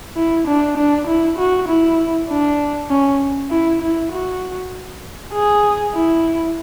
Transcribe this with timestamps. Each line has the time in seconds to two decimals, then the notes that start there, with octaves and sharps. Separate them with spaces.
0.16 E4
0.47 D4
0.77 D4
1.07 E4
1.38 F#4
1.69 E4
2.29 D4
2.90 C#4
3.51 E4
3.82 E4
4.12 F#4
5.33 G#4
5.95 E4